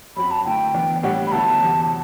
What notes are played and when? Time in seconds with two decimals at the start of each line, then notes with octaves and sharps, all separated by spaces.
0.17 F#2 F#3 C4 F#4 B5
0.31 A5
0.45 D3 A3 E4 G5
0.74 E3 B3 D4
1.03 A2 G3 D4 G4 F#5
1.27 B5
1.32 D3 F#3 B3 E4 A5
1.61 E2 C3 E3